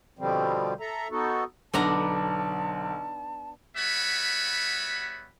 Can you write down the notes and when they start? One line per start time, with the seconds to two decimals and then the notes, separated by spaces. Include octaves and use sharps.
0.19 B2 D3 F3 G3 C4
0.80 A4 E5 A#5
1.11 B3 D#4 F#4 A4
1.73 B1 D3 B3 D4 A5 A#5
3.77 G3 B3 F#4 C#5 E5 B5